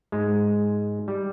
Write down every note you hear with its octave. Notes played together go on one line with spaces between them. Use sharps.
G#2 G#3
G3